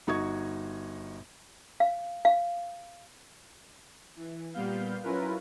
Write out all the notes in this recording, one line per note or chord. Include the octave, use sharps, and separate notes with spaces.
G1 D#4 F#4 D#5 C#6 G#6
F5
F5
E3
A#2 G3 B3 F5 G6
F#3 C#4 E4 F4 A#4 B4